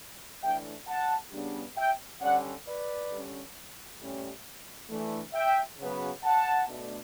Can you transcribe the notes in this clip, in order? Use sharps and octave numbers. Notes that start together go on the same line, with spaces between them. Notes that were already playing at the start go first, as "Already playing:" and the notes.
A2 E3 A3 D4 E5 G5
F#5 A5
C#3 G3 B3 D4
E5 G5
D3 G3 C#4 D5 F#5
B4 D5
D3 G3 C#4
A2 G3 C#4
E3 A3 D4
E5 G5
C#3 F#3 B3
F#5 A5
B2 A3 D4